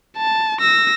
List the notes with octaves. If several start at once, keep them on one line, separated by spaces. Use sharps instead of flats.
A5
E6 A#6